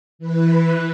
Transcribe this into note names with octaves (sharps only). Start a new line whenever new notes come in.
E3 B4